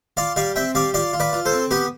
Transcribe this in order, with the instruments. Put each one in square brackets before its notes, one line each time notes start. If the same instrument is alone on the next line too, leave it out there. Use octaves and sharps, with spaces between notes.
[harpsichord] F4 D5 F5
G3 D5 F5
C4 E5 G5
G3 D5 F5
F4 D5 F5
F4
B4 D5
F4
A4 C5
C4
B3 G4 B4